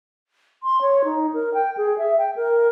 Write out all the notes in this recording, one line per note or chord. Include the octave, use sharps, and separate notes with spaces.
C6
C#5
D#4
A#4
G5
G#4
E5
G5
A#4